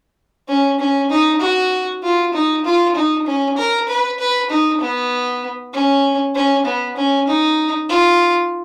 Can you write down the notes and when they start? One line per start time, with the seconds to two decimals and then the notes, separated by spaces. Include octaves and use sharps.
0.49 C#4
0.80 C#4
1.10 D#4
1.41 F#4
2.03 F4
2.34 D#4
2.65 F4
2.96 D#4
3.26 C#4
3.57 A#4
3.88 B4
4.19 B4
4.50 D#4
4.81 B3
5.73 C#4
6.35 C#4
6.66 B3
6.97 C#4
7.27 D#4
7.89 F4